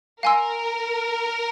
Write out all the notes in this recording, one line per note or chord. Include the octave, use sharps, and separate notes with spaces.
A#4 F5 G#5 C6 E6